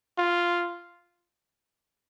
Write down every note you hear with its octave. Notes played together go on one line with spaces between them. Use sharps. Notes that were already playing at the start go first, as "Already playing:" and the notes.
F4